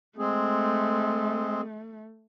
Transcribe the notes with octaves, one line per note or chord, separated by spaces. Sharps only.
G#3 A3 C4 G#4